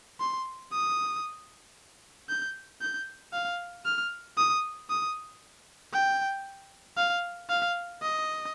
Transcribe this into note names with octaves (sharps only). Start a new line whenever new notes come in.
C6
D#6
G6
G6
F5
F6
D#6
D#6
G5
F5
F5
D#5